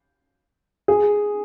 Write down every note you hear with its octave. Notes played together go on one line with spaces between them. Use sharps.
G#4